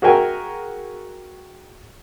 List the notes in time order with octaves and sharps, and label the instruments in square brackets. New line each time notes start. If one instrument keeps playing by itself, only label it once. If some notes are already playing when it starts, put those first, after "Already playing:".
[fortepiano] F#4 G#4 A#4 E5 G5 G#5